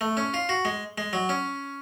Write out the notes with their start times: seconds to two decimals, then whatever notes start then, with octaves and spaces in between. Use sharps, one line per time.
0.01 A3
0.17 C#4
0.34 F4
0.49 F#4
0.65 G#3
0.98 G#3
1.13 F#3
1.29 C#4